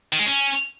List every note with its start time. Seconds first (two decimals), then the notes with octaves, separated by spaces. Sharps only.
0.13 D#3
0.19 G#3
0.26 C#4